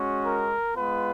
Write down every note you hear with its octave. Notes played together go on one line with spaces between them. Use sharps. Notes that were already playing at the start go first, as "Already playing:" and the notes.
Already playing: G#3 C#4 F#4
A#4
G#3 B3 F4 B4